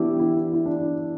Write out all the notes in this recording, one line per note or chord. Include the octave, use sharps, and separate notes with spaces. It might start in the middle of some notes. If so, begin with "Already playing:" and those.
Already playing: E3 B3 D4 E4 G4
E4
E4
D4